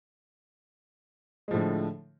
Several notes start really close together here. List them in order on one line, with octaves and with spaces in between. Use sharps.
G#3 F3 A2 D3